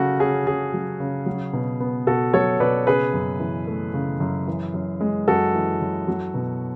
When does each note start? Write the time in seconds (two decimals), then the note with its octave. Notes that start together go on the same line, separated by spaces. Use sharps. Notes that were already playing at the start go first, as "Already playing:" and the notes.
Already playing: C#3 F#3 F#4 A4
0.19 C#4 G#4
0.46 C#3 G#4
0.74 F#3
1.00 C#3
1.26 F#3
1.53 B2
1.80 B3
2.07 B2 F#4 A4
2.34 F#3 A4 C#5
2.60 B2 B4 D5
2.87 C#3 G#4 B4
3.13 F#2
3.40 E3
3.67 A3
3.94 C#3
4.20 F#2
4.48 E3
4.74 F#2
5.01 G#3
5.28 F#2 F#4 A4
5.54 E3
5.81 F#2
6.08 F#3
6.34 B2